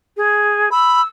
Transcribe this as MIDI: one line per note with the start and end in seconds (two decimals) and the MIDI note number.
0.16 0.69 68
0.71 1.01 83
0.71 1.07 88